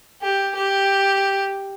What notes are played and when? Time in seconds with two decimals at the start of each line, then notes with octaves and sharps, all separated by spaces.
0.22 G4
0.55 G4